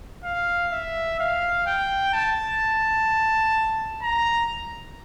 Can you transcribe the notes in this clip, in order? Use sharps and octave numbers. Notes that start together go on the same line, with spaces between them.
F5
E5
F5
G5
A5
A#5